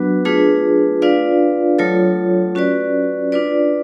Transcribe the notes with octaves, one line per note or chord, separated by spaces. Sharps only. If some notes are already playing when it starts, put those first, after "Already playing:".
Already playing: F#3 B3 D4 F#4 B4
A3 D4 F4 G#4 B4
D4 F4 B4 D5 F5
F#3 A3 F4 A4 C#5
C#4 F#4 B4 D5
D4 F4 B4 D5